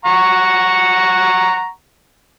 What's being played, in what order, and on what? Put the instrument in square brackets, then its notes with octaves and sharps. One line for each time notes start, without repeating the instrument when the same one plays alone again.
[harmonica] F#5 A#5 C#6